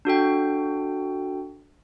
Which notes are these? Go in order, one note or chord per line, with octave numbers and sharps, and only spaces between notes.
D4 F#4 A4 G5